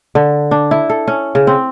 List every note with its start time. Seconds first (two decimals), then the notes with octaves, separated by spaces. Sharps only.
0.15 D3
0.51 D4
0.71 E4
0.90 A4
1.08 C#4
1.35 C#3
1.47 C4